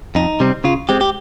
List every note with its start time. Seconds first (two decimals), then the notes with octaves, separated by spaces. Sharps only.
0.15 F2 D#4
0.40 C3 G3 C4
0.64 C#3 F4
0.89 G#3 C4 G4
1.01 G4